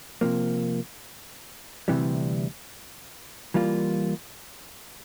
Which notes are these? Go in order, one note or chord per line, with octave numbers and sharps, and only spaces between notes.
C3 F3 A#3
D2 C3 E3 G3
E3 G3 A#3 F4